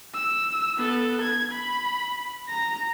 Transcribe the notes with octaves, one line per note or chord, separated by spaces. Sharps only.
E6
B3 A4
G#6
B5
A#5 A#6